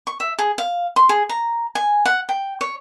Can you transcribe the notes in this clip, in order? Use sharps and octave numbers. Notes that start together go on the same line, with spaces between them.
C#6
E5
G#4
F5
C6
G#4
A#5
G#5
F#5
G5
C#5